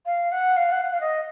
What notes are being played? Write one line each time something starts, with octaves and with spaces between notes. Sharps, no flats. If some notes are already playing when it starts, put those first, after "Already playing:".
F5
F#5
F5
F#5
F5
F5
D#5